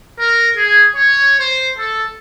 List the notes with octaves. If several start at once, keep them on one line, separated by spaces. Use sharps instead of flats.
A#4
G#4
C#5
C5
A4